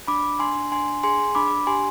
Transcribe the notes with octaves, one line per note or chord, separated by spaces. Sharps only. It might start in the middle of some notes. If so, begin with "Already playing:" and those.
D4 B5 D6
D4 G#5 C6
D4 G#5 C6
G#4 G#5 C6
D4 B5 D6
G4 G#5 C6